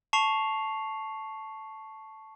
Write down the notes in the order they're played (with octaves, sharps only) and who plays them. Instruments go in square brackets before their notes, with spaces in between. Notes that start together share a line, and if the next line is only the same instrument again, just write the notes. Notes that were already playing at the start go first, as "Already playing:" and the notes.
[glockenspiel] A5 C#6 C7 F7